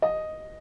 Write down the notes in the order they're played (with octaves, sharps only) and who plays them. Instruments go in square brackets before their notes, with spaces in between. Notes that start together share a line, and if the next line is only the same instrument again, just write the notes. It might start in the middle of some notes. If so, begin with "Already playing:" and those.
[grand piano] D#5